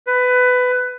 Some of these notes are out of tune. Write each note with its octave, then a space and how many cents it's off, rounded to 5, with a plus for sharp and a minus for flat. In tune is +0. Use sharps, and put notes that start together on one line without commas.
B4 +15